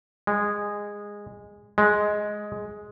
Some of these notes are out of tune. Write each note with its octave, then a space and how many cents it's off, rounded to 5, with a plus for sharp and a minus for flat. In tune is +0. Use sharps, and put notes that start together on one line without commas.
G#3 -15
G#3 +5